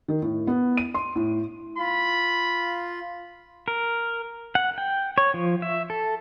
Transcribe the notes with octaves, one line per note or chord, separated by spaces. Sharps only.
D#3
A2
B3
D#7
C6
A2
F4 B5
A#4
F#5
G5
C#5
F3
E5
A4